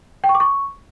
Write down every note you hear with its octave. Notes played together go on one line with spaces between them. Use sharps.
G5
C#6
D6
C#6